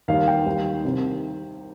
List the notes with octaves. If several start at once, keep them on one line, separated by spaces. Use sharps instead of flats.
D#2 D#3 G3 F5
G5
D#2 D#3 G3
C2 C3 D#3